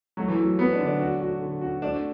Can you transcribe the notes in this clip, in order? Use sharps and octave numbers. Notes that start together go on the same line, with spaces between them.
F#3 A3
E3
F#3
F#3 B3
D4
D3
D4
F#4
F#4
D3
F#4
A3 D4